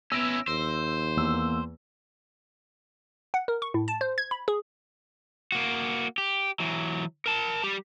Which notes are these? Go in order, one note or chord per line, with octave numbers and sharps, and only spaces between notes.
B3 C#4 E4 E6 A#6 D7
D#2 C5
E2 A#3 E6
F#5
A#4
C#6
A2
A5
C5
G#6
B5
G#4
A#3 F#4
G4
E3 F#3
A#4 A5
G3 G4